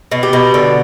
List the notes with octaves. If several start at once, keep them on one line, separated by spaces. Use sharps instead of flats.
B2
G4
B2
D3